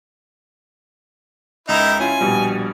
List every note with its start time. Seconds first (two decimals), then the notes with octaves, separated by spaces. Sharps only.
1.69 C#2 D#4 E4 A#4
1.99 C#4 E4 F4 G#5
2.21 A#1 B2 G3